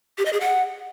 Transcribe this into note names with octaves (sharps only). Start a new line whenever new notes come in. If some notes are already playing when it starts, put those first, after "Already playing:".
G4
D#5
G#4
F#5